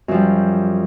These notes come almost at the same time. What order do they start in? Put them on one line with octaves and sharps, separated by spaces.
F#2 F3 G3